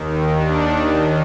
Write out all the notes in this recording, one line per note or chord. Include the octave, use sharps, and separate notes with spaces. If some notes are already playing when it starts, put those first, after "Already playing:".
Already playing: D#2 D#3
D4